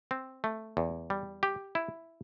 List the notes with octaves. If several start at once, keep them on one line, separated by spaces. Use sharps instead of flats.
C4
A3
E2
G3
G4
E4